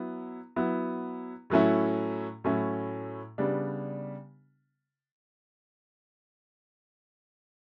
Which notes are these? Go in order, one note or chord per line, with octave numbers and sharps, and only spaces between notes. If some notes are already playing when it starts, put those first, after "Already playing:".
Already playing: F#3 B3 E4
F#3 B3 E4
A2 F#3 A3 C#4 E4
A2 F#3 A3 C#4 E4
C#3 G3 B3 D4